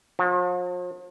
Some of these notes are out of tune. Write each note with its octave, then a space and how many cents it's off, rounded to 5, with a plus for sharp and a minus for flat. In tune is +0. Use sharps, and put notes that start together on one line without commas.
F3 +45